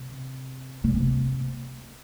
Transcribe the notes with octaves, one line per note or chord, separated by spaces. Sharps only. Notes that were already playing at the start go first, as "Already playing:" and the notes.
Already playing: C3
C3